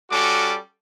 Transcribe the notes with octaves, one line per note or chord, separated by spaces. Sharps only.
G3 C#4 F#4 A4 D6